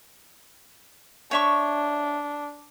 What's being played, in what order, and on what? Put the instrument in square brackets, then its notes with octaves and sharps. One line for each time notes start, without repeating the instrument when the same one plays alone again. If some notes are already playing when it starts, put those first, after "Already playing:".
[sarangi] D4 [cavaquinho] C#5 E5 C#6